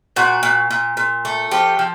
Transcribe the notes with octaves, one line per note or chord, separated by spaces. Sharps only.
A#2 F#4
A#2
A#2
A#2
A3
F3 G4
F3